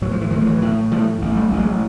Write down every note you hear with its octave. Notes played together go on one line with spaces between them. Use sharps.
A2 F#3
F3
E3
A2 D#3 F3
F3
E3 F#3
A2
A2 F3 G3
A1
G3 A3
A1
F#3 G#3